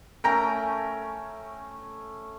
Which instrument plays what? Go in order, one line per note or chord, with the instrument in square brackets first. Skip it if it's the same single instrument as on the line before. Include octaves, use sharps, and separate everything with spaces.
[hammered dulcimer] A3 C#4 G#5 [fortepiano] A#4 G5 A#5